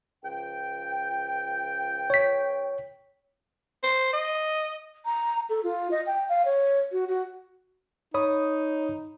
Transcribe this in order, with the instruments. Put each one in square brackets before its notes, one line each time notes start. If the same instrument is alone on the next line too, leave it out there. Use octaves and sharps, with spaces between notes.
[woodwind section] C#2 F3 G5
[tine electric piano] C#5 B6
[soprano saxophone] C5
D#5
[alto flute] A#5
A4
F4
D#5
G5
F5
C#5
F#4
F#4
[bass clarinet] D#4 [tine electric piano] C#5 B5 D#6